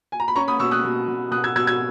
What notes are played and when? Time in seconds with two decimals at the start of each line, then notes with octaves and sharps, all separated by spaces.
0.12 G#5
0.20 A#5
0.28 B5
0.36 C#4 A#5 C#6
0.48 B5 D#6
0.59 B2 C#6 E6
0.71 D#6 F#6
0.84 B2
1.08 B2
1.31 B2 D#6 F#6
1.44 E6 G#6
1.56 B2 E6 G#6
1.67 E6 G#6